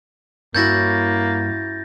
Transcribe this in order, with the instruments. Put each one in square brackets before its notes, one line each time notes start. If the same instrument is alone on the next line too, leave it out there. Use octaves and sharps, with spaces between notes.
[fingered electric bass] G2 [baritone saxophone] A#3 [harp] C#4 E4 F#4 [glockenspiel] G6 A6 A#6